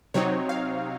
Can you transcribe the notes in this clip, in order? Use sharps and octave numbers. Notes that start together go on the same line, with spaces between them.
C3 F#3 C4 D#4 C#5
F5